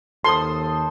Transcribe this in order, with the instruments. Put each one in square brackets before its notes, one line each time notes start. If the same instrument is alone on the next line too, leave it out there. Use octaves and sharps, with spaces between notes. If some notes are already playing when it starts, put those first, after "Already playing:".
[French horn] D#2 [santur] A4 C5 D#6 [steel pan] C6